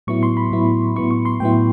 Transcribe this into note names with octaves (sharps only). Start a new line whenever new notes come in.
A2 F#3 B3 E4 C#6
C6
B5
A2 F#3 B3 E4
A2 F#3 B3 E4 C#6
C#6
C6
A2 F#3 B3 E4 G5